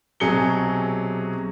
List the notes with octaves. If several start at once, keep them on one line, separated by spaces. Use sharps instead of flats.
B1 C3 F#3 G#4 C#7 G7